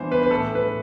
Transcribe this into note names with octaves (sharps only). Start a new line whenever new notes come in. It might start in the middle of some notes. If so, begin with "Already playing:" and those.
Already playing: E3 B3 D4 C5
B4
B4
A2 A4
B4